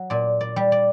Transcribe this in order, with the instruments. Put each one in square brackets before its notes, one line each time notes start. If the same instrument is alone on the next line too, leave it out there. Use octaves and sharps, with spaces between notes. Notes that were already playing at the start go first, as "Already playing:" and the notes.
Already playing: [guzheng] F#3
A#2 D5
D5
G3
D5